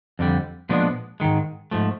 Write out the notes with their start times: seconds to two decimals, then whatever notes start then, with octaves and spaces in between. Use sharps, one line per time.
0.19 F2 D3 G3
0.69 A#2 F3 G#3 B3 D4
1.20 G#2 D#3 G#3
1.71 G#2 F3 A3